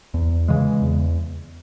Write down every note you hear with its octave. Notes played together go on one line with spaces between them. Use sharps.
E2
C#3 E3 G#3
E2